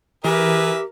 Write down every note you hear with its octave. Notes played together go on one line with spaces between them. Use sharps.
E3 G4 G#4 A#4 B4 E5